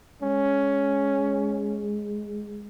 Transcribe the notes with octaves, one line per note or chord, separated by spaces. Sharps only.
G#3 C#4